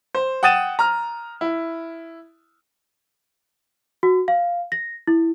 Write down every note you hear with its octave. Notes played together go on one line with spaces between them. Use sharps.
C5
F#5 G5 D#6 A6 D#7 E7
A#5 F6
E4
F#4
F5
A#6
E4